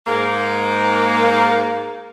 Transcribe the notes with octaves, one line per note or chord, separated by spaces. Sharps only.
G#2 A#3